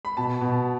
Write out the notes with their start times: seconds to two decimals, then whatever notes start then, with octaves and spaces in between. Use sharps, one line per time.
0.05 B5
0.17 B2 A5
0.41 B2